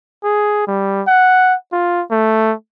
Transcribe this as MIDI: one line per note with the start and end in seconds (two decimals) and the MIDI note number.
0.24 0.64 68
0.67 1.02 55
1.07 1.55 78
1.73 2.03 65
2.11 2.54 57